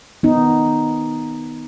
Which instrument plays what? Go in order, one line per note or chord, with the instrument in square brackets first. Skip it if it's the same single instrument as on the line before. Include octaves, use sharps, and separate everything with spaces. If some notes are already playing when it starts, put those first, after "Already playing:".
[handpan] B3 D#4